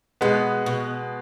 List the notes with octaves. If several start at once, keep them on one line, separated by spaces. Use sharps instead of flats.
B2 G#3 B3
B2